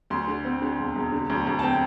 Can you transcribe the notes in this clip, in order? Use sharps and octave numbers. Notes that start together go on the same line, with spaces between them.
D2 C6
D3
C4
D3
E1
E1
D3
D2
D2
A5
C4 G5